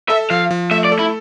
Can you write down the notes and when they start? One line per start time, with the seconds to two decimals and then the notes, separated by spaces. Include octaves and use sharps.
0.09 A4 E5
0.30 F3 F5
0.51 F3
0.71 A3 E5
0.85 D5
0.92 A4
0.99 E4